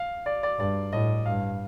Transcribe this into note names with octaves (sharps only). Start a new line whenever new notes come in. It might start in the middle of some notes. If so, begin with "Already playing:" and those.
Already playing: F5
D5
D5
G2 D5
A2 D#5
G2 F5